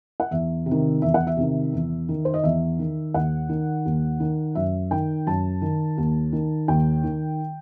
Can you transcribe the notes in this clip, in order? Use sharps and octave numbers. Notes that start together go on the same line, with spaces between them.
F#5
E2 E5
C3
D#3
E2 E5
F#5
E5
C3 D#3
E2
D#3
C5
D#5
E2 E5
D#3
D#2 F#5
D#3
D#2
D#3
F#2 E5
D#3 G5
F#2 A5
D#3
D#2
D#3
D#2 G5
D#3